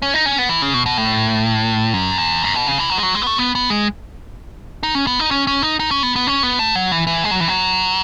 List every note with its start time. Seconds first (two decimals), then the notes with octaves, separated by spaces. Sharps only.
0.02 C#4
0.14 D#4
0.26 C#4
0.38 B3
0.49 E3
0.62 C#3
0.74 B2
0.86 B2
0.98 A2
1.94 F#2
2.18 E2
2.43 F#2
2.55 B2
2.67 C#3
2.79 E3
2.90 F#3
2.98 G#3
3.03 F#3
3.15 G#3
3.22 B3
3.27 A3
3.38 B3
3.55 B3
3.70 G#3
4.83 D#4
4.95 C#4
5.07 B3
5.19 D#4
5.31 C#4
5.47 C#4
5.62 D#4
5.80 D#4
5.91 C#4
6.03 B3
6.16 B3
6.27 C#4
6.43 B3
6.59 A3
6.75 F#3
6.92 E3
7.07 E3
7.24 G#3
7.31 F#3
7.40 E3
7.48 F#3